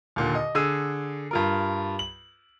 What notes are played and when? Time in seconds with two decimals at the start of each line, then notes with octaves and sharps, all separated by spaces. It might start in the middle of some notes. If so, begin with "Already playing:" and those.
0.16 D#2 A#2 D3
0.35 D#5
0.55 D3 G#4 E6 D#7
1.31 G2 F4 A#4
1.99 F#7